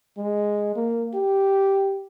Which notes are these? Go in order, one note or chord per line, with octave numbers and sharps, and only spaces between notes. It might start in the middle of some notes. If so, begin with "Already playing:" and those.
G#3
A#3
G4